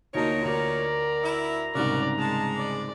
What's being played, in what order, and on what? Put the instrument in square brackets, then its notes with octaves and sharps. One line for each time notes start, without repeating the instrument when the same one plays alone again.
[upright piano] D2 F#4 A5 [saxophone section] A#2 C#5 [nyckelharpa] A#3 D#4 [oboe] A#4
[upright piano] D2 [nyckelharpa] A#4 D5 [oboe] A#5
[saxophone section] E4
[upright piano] C2 G#2 C#3 [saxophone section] F#4 A#4 [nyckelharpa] D5
[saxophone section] G#3 [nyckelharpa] A5
[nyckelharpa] D5